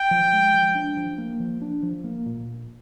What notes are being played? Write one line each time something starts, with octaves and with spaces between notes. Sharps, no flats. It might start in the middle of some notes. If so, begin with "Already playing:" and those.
Already playing: G5
F3
G#3
F3
D4
F3
A#3
F3
D4
F3
A#3
A#2